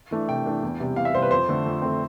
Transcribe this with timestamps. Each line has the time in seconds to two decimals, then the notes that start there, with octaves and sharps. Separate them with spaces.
0.11 E3 A3 D4
0.28 C3 G5
0.46 E3 A3 D4
0.63 E2
0.80 C3 G3
0.96 E2 F5
1.05 E5
1.14 C3 G3 C5
1.22 B4
1.31 F2 C5
1.48 D3 A3 C4
1.66 F2
1.82 D3 A3 C4